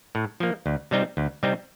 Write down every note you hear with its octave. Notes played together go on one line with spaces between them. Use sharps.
A2
F3 A#3
D2
C3 G3 C4 D#4
D2
C3 G3 C4 D#4